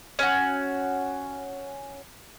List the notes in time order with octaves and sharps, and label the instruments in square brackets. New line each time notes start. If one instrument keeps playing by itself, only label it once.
[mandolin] C#4 F#4